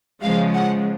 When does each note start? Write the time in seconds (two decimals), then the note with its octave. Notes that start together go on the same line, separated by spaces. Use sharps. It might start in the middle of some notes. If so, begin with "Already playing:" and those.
0.21 C#3 F3 G#3 F5
0.54 F#5